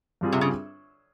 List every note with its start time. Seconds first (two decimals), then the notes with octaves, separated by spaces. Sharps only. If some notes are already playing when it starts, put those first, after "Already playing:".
0.21 G2 G3 C4 F4 G#4
0.32 C3
0.41 C#3